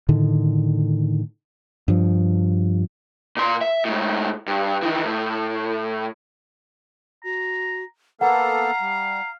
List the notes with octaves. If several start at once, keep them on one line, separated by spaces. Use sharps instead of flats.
A2 D3 D#3
G2 F3
A#2 C6
E5
A2 G#3
G2
D#3 E3
A2
F#4 A#5
A#3 B3 A4 F5 F#5 A#5
G3